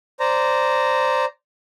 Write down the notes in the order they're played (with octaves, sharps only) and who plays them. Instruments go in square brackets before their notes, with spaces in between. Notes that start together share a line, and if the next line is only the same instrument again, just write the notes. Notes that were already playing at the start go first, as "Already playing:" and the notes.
[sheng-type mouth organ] C5 D5 A#5